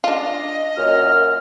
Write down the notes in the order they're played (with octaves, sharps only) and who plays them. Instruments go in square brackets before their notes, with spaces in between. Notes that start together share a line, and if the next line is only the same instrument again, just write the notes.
[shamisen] D4 F4 [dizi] D#5
[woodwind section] F#2 A#2 F6